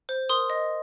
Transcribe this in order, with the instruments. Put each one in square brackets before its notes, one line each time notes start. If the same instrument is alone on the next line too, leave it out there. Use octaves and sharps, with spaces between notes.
[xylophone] C5
A#4 C6 D#6
D#5